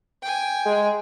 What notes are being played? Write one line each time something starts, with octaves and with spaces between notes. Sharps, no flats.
G5 G#5
G#3